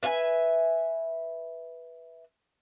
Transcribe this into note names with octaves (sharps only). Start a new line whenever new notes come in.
B4 E5 F5 G#5